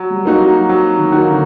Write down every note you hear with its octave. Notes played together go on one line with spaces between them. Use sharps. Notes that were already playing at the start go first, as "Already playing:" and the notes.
Already playing: F#3
G3
A#3 D#4 F#4
F#3
F#3
D#3
A#3 D#4 F#4
D3